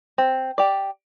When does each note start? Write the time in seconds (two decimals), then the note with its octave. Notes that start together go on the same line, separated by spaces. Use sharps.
0.18 C4
0.58 G4 D5